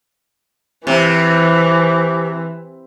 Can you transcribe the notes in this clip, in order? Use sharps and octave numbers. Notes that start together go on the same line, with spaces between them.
C3 E3